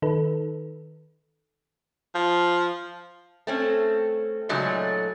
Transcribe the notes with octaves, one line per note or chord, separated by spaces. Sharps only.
D#3 D#4 A4 B4
F3
A3 C4 C#4
A#2 C#3 F#3 G#3 A3 D#4